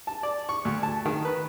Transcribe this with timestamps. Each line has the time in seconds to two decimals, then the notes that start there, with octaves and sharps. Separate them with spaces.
0.07 A5
0.23 D5
0.49 C#6
0.65 D2
0.83 A5
1.06 D#3
1.25 B4